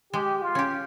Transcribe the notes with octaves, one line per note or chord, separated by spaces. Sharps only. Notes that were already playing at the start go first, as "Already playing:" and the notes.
G#3 G4
F4
C#4 G4